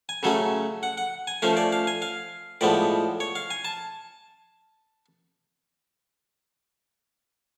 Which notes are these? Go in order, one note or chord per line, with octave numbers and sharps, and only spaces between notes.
G#5
C#3 F#3 A3 C#4 A4
F#5
F#5
G#5
F3 A3 C#4 F5
D5
F5
G#5
F5
A2 F3 G#3 B3 D5
C#5
F5
G#5
A5